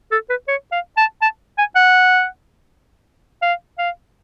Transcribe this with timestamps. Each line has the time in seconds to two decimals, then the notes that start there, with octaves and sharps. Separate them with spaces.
0.12 A4
0.30 B4
0.48 C#5
0.72 F5
0.97 A5
1.22 A5
1.58 G#5
1.76 F#5
3.42 F5
3.78 F5